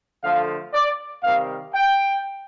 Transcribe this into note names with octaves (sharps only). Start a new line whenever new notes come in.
D3 F3 A3 F5
D5
C3 D#3 G3 F5
G5